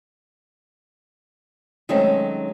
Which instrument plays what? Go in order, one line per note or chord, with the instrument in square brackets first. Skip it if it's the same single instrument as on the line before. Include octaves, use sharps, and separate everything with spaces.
[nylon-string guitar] D#3 F#3 G#3 A3 C4 C#4